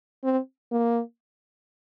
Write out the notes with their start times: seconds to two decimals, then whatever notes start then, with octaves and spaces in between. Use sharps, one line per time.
0.24 C4
0.72 A#3